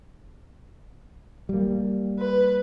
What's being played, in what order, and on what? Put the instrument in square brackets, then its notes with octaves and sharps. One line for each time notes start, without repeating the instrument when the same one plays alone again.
[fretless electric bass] G3 A#3
[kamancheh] B4